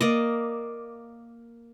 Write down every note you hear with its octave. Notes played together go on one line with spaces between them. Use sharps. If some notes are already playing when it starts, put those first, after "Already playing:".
A#3 D5 D#5